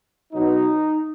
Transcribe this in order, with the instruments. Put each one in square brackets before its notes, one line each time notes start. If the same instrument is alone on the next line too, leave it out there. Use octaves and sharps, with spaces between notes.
[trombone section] B2 F#3 B3 D#4